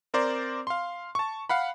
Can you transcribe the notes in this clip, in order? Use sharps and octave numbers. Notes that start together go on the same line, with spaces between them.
C4 A#4 C5 D5
F5 C6
A5 C#6
F5 F#5 B5